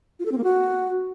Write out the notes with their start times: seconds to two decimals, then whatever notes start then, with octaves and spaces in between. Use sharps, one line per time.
0.19 F4
0.25 A4
0.32 C4
0.38 A#3
0.44 F#4